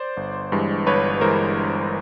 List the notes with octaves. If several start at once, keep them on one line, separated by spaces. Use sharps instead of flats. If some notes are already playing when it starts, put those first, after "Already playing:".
Already playing: C5 D5
G1
G2 E3 G#3
G1 B4 C#5
E3 G#3 A#4 C5